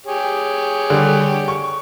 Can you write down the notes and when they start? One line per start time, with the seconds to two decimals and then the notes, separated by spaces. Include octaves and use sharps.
0.06 G4 G#4 C#5
0.90 D3 G3
1.48 C#6